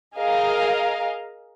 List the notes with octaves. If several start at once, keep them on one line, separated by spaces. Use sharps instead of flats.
G#4 A#4 D#5 F5